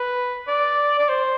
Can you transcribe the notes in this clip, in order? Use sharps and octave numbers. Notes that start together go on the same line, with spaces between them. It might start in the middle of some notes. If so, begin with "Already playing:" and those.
Already playing: B4
D5
D5
C5